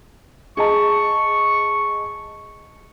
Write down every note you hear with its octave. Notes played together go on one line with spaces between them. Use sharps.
G#4 D#5 A5 C#6